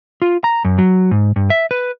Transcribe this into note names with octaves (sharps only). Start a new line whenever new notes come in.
F4
A#5
F#2
F#3
G#2
G2
E5
B4